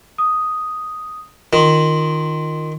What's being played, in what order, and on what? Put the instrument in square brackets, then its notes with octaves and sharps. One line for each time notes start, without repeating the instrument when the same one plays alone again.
[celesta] D#6
[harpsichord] D#3 [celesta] F4 C6 F#7